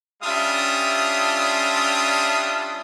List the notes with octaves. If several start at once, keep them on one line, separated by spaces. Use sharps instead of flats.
G3 C#4 D4 F4 E5 D#6